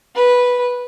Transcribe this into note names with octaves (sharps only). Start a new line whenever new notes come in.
B4